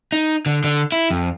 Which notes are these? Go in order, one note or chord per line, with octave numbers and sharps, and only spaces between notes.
D#4
D3
D3
E4
F2